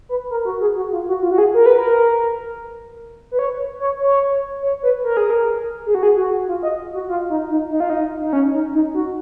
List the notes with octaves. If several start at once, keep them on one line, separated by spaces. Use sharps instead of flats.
B4
A#4
F#4
G#4
F#4
F4
F#4
F4
F#4
G#4
A#4
B4
A#4
B4
C#5
C#5
C#5
C#5
B4
A#4
G#4
A#4
G#4
F#4
G#4
F#4
F4
D#5
F#4
F4
D#4
D#4
D#4
F4
D#4
D#4
C#4
D#4
D#4
F#4